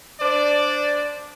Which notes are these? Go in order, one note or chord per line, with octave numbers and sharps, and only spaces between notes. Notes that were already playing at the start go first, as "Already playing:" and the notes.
D4 C5 D5